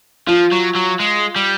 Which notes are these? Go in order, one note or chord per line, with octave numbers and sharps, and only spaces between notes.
F3 F4
F#3
F#3
G#3
G3